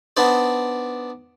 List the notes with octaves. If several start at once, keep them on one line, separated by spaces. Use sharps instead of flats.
B3 D4 D#4 C5 D5